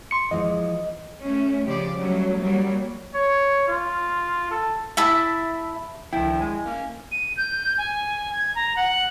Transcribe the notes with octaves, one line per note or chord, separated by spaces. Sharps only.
C6 C#7
E3 F3 G#3 D#5
A3 C#4
C#3 F3 G4 D5
F#3 G3 A3 C#4
F#3 G3 A#3
C#5
F4
A4
E4 E5 A5
C#2 D3 D#3 F3 E4 G5
G#3 G#5
A#3 C#4
D#7
G6
G#5
G#6
A#5
F#5